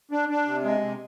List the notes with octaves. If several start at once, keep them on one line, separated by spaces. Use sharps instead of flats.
D4
D4
C3
G#3
C3